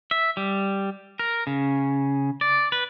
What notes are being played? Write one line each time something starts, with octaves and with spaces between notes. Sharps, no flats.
E5
G3
A#4
C#3
D5
B4